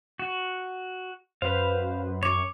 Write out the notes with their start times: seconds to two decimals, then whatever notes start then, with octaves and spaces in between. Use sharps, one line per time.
0.19 F#4
1.42 F#2 B4 C5 F5
2.23 C#5 C#6 D6